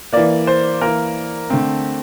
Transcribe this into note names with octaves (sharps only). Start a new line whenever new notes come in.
E3 A#3 D5
C5
E3 A#3 A#4
D3 A3 C4